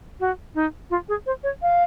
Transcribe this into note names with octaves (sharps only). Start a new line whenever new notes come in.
F#4
D#4
F4
G#4
C5
C#5
F5